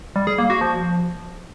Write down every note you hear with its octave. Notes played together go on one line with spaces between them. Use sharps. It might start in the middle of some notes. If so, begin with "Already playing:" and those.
G3
G#4
A#3
F#4
F3